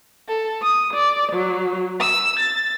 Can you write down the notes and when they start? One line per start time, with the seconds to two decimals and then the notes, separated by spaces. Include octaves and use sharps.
0.27 A4
0.62 D#6
0.94 D5
1.32 F#3
2.00 E6
2.38 A6